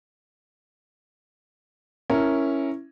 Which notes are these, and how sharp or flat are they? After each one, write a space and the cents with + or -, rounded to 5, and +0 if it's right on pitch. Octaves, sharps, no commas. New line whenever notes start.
C#4 -5 E4 +0 A#4 +0